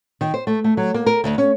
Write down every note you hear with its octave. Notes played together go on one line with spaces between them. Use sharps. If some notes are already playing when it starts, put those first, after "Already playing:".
D#3
C5
A3
A3
F#3
A#3
A#4
D2
C#4